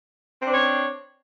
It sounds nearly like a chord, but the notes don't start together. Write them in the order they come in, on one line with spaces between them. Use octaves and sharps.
C4 D4 C5 C#5